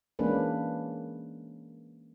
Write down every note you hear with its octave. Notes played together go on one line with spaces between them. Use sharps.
E3 G#3 A#3 C#4 D4 B4